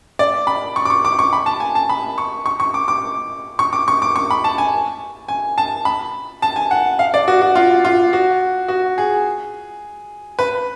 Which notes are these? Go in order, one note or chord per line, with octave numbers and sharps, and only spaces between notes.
D5
B5
C#6
D6
C#6
D6
C#6
B5
A5
G#5
A5
B5
C#6
C#6
C#6
D6
D6
C#6
D6
C#6
D6
C#6
B5
A5
G#5
G#5
A5
B5
A5
G#5
F#5
F5
D5
F#4
F#4
F4
F4
F#4
F#4
G#4
B4